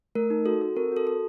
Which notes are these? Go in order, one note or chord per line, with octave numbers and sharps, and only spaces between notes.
A3 A#4
D#4
F#4 A4
A4
C4 A#4
F#4 A4
A4